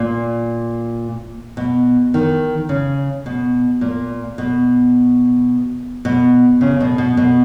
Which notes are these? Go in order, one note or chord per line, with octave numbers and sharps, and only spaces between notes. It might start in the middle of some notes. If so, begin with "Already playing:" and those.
Already playing: A#2
B2
D#3
C#3
B2
A#2
B2
B2
C#3
B2
B2
B2